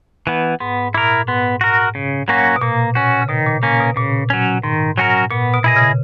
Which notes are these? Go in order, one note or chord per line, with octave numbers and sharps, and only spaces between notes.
E3 B3
G#2 B3
A#2 E4 A#4
G#2 B3
F#4 A#4
C#3
F#3 A#3 C#4 F#4
B2
A#2 A#3
C#4 F#4
C#3
B2 D#3
A#2
A#2 A#3 C#4
B2
A#2 C#3
F#3 C#4
G#2 D#3
F#3 C#4 F#4 A#4
A#2 B3
B2
E4 G#4 D#5
C#3